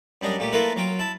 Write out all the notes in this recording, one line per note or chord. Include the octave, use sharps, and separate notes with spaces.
F#2 G3 D4 D#5
A#2 A3 G4
A3 A#3 E4 F4 A#4 B4
F#3 F4 G5
E4 A5